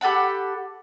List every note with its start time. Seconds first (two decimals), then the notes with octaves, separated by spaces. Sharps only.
0.01 G4 A4 F#5 B5